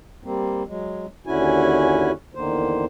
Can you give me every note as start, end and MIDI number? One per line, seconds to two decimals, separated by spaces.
0.24 0.63 55
0.24 0.63 58
0.24 0.63 60
0.67 1.06 54
0.67 1.06 56
1.26 2.12 39
1.26 2.12 50
1.26 2.12 61
1.26 2.12 64
1.26 2.12 66
1.26 2.12 80
2.35 2.85 40
2.35 2.85 50
2.35 2.85 51
2.35 2.85 58
2.35 2.85 72